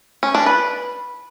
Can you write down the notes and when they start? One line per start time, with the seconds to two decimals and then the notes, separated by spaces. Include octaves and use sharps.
0.23 C#4
0.35 D4
0.46 B4